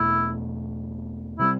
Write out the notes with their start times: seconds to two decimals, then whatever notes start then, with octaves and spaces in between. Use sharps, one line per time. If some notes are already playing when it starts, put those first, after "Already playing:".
Already playing: E2 B2 A3 E4
1.39 C3 G3 C4 E4